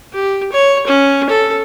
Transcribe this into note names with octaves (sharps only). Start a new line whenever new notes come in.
G4
C#5
C#4
A4